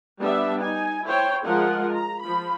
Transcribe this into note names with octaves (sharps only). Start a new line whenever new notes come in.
G3 B3 D4 E5
D#4 G#5
E4 C5 C#5 G5
F3 G#3 F4 A#4 F#5
A#5
F3 B5